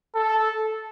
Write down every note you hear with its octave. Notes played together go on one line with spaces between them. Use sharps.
A4